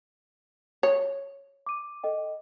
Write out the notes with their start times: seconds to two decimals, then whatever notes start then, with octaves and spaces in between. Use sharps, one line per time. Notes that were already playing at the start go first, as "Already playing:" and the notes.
0.83 C#5
1.66 D6 D#7
2.03 A4 D#5 G5